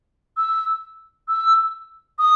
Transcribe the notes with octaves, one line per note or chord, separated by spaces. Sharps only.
E6
E6
D#6